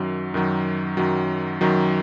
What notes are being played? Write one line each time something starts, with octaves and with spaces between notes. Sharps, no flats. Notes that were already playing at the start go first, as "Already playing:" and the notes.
Already playing: F#2 D#3 F#3
F#2 D#3 F#3
F#2 D#3 F#3
F#2 D#3 F#3